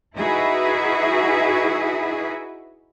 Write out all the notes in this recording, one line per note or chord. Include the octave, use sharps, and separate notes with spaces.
D#4 E4 F#4 G#4 B4 E5